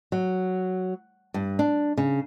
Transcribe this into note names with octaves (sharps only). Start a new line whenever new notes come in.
F#3
G2
D4
C#3